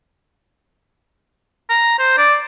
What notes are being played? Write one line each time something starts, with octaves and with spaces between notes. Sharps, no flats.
A#5
C5
D5